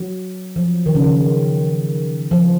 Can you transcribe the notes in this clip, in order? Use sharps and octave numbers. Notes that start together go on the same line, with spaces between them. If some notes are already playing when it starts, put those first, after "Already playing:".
Already playing: F#3
F3
D#3
C#3
D#3
F3